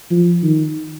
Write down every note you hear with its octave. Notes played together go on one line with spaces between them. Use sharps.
F3
D#3